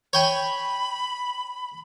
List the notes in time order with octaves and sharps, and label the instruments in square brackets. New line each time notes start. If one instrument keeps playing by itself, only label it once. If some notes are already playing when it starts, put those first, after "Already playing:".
[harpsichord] C#5 G5 G#5 [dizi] B5